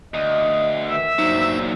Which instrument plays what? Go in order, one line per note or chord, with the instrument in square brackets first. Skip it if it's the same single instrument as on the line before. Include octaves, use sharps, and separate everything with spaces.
[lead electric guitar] D2 [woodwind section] D#5
[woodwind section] D#3 E3 [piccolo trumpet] E5
[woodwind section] G2 C5 [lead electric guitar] A#2 F#3 [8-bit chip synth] D#4